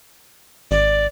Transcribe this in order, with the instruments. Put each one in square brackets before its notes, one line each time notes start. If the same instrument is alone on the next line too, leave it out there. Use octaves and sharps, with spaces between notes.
[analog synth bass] G#1 [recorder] D5